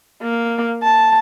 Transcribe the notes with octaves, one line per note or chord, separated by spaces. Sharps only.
A#3
A5